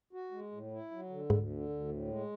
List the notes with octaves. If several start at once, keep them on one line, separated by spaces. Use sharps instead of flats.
F#4
G#3
A2
E4
F#3
D3
D2 G#2
D3
D2
A2
G#3